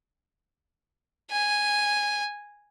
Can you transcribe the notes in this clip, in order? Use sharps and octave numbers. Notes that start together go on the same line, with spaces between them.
G#5